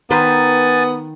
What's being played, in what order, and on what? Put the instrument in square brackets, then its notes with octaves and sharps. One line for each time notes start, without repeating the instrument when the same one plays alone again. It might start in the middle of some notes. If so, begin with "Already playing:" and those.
[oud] D#3 B4 C5 [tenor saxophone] B3 [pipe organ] G#5 A6